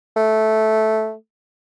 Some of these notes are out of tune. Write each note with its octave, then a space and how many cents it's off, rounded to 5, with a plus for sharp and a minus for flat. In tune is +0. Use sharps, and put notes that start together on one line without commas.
A3 -10